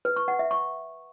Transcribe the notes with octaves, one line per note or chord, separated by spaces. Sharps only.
B4
C#6
F#5
E5
C#6